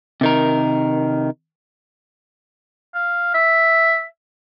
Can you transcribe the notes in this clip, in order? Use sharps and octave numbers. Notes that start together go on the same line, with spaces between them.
C3 D#3 A#4
F5
E5